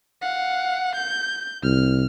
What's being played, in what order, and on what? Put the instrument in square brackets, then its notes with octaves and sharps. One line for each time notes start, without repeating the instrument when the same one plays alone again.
[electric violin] F5 F#5
G6
[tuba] C2 [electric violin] F6